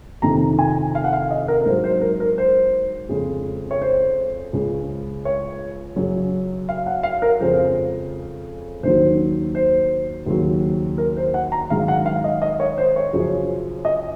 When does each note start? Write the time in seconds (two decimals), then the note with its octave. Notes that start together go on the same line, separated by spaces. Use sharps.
0.22 F2 C3 D#3 A#5
0.59 G#5
0.95 F5
1.04 F#5
1.13 F5
1.31 D#5
1.48 A#4
1.61 A#4
1.66 G#2 C5
1.70 F#3
1.84 C5
2.01 A#4
2.20 A#4
2.38 C5
3.09 F2 C#3 G#3
3.71 C#5
3.82 C5
4.53 C#2 C#3 G#3
5.25 C#5
5.96 F#2 C#3 F#3
6.69 F5
6.86 F#5
7.03 F5
7.22 A#4
7.40 F2 C#3 F3 G#3 C5
8.83 D#2 D#3 F#3 C5
9.55 C5
10.26 D#2 C#3 F#3
10.98 A#4
11.17 C5
11.34 F#5
11.52 A#5
11.70 G#2 D#3 F#3 F5
11.88 F#5
12.06 F5
12.24 D#5
12.42 D#5
12.60 C#5
12.78 C5
12.96 C#5
13.13 F#2 C#3 F3
13.85 D#5